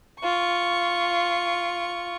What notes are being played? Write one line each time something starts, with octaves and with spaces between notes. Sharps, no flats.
F4 C#6